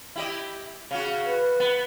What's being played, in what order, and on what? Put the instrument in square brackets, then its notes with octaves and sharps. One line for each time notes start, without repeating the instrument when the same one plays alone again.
[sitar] E4 G4 D#5
C#3 F#4
[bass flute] B4
[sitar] B3